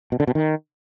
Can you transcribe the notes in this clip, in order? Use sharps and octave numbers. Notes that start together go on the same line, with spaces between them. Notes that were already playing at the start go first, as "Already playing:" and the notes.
B2
D3
B2
D#3